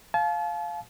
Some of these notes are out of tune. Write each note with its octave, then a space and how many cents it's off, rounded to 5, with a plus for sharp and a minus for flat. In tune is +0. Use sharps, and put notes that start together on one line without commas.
F5 +0 A5 -40